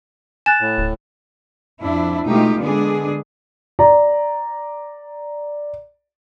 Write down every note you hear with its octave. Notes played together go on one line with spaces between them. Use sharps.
G#5 F#6 A6 E7
A2
D1
F2 D4 E4
B2 G#3 A3 D#4 F4 G4
D3 G#3 B3 D4 G#4
D5 A#5